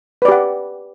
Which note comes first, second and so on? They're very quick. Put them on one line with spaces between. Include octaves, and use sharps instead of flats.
B4 D5 G4 F#5